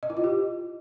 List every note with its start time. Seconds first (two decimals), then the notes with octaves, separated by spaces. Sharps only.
0.03 D#5
0.10 E4
0.17 F4
0.24 G4